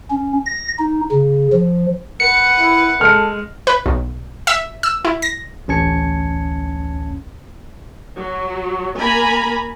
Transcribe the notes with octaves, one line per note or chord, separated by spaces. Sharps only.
C#4
A#6
D#4
C#3
F3
B4 F#5 C#7
E4
G#3 A4 F6 C#7
B4
B1
E5
E6
E4
A#6
A1 D2 C#4 A5 G#6 C#7
F#3
A#3 G#5 A#5 B5